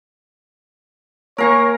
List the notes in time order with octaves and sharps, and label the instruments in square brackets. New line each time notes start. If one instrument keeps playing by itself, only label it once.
[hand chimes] A#3 G#5 [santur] A#4 F5 A#5 [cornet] C#5